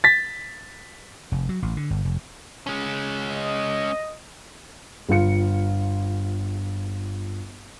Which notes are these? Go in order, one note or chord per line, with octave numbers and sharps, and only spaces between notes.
A6 B6
F1
F#3
A1
D3
G1
F1
G#3 C#4
D#5
G1 F4 F5 C#7